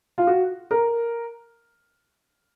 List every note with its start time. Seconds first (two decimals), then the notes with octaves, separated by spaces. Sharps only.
0.18 F4
0.27 F#4
0.71 A#4